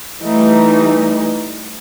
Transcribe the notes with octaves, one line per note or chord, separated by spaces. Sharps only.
E3 G3 A3 D#4